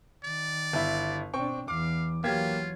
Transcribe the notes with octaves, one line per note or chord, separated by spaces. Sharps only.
D#3 D5
G1 E4
B2 C4 D4 G5 C#6
E2 E3 F5 D6
E3 F#3 A#3 F4 G4 G#6